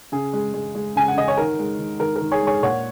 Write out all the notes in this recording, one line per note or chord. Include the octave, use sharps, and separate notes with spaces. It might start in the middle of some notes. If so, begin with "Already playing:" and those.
C#3 G#4
G#3
G#3
G#3
C#3 G#5
F#5
C#3 D#5
C#5
D#3 A#4
G#3
D#3
D#3 A#4
A#4
D#3
G#4 C#5
G#3 G#4 C#5
A#2 C#5 F#5